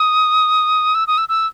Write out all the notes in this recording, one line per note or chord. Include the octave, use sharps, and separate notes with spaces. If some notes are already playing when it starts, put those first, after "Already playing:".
Already playing: D#6
E6
D#6
E6
E6